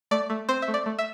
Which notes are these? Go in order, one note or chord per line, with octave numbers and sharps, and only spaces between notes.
A3 D5
A3
C4 C5
E5
A3
D5
A3
E5